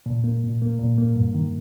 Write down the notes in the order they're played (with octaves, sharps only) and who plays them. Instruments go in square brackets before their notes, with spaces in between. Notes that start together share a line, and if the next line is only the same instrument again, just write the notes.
[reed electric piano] A#2
A#3
A#2
A#3
A#2
A#3
G2
D#3